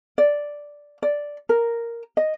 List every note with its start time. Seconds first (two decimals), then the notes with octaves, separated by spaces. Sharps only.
0.18 D5
1.02 D5
1.49 A#4
2.17 D#5